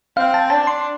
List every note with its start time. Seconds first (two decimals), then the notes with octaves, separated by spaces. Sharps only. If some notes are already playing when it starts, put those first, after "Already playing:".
0.17 C4 F5
0.34 A5
0.50 D4 A5
0.67 C6